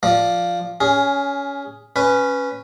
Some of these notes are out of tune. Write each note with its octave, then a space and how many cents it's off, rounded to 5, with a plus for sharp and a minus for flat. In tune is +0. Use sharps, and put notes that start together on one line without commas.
F3 +0 D5 +0
C#4 +20 G#4 +0
C#4 +0 B4 +5